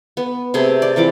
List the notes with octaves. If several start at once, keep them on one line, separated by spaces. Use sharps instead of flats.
B3
C3 A3 G#4
D5
C3 E3 F3 D6